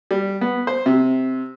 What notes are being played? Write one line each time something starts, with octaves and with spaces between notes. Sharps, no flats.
G3
B3
C5
C3